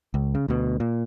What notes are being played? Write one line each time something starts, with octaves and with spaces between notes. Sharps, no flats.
C#2
C#3
D2 B2
A#2